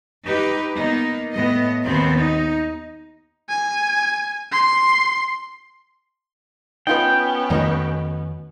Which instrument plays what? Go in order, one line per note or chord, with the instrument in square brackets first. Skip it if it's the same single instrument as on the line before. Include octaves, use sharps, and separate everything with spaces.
[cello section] D#4 G4 B4
A#3 B3 D#4
A2 B3 D#5
D#2 B3 C4
D#4
[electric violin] G#5
C6
[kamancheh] B3 C#4 [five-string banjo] D#4 F4 B4 [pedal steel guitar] G5
[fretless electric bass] F2 D#3 A3 [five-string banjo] F#4 D#5 A#5